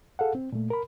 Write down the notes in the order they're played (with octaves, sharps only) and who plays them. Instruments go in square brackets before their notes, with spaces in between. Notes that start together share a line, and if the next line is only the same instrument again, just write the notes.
[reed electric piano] G#4 A4 F5 F#5
C4
A#2 A3
A#4 B5